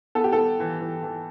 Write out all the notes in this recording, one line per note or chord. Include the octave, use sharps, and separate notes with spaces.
B3 A4
G4
A4
B3
E3
E3
E3